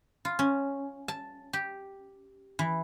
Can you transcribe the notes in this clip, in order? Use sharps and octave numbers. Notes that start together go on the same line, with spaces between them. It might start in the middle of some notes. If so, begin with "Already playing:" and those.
F4
C#4
A5
G4
E3